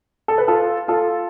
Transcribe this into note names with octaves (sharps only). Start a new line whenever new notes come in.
A4
B4
F4 A4
F4 A4